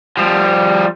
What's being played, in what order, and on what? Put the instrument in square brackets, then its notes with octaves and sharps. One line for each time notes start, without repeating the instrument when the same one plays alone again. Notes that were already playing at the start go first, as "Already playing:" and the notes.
[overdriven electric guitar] F3 G3